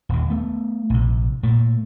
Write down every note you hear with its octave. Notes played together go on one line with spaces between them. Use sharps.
D#1 D#2
A3 B3
A#1 C3
A#2 A3